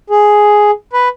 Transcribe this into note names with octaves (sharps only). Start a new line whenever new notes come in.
G#4
B4